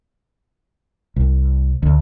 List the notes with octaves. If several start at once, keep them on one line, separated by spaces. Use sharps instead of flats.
C2
D2